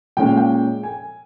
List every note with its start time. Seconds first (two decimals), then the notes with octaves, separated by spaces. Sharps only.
0.17 A#2 G#3 C#4 G5
0.27 F5
0.37 G5
0.83 G#5